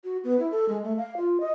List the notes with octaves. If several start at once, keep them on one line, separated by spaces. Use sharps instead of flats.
F#4
B3
E4
A4
G#3
A3
F5
F4
D#5